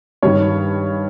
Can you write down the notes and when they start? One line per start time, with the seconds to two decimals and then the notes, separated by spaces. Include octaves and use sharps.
0.23 G2 D#3 C#5